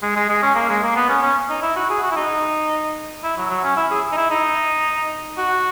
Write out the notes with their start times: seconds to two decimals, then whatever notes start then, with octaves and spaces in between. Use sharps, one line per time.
0.02 G#3
0.16 G#3
0.29 G#3
0.42 C#4
0.55 A#3
0.69 G#3
0.83 A#3
0.96 B3
1.09 C#4
1.23 C#4
1.50 D#4
1.62 E4
1.76 F#4
1.90 G#4
2.03 F#4
2.11 E4
2.16 D#4
3.24 E4
3.37 F#3
3.50 F#3
3.63 C#4
3.76 E4
3.91 G#4
4.12 D#4
4.17 E4
4.31 D#4
5.37 F#4